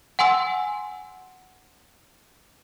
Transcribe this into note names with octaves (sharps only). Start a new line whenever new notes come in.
F#5 G#5 C6 E6